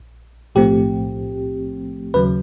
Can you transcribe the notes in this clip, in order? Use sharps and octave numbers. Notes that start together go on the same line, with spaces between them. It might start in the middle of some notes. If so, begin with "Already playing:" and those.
Already playing: A#1
B1 A2 F3 A3 C4 G4
D#2 C#3 F#3 B4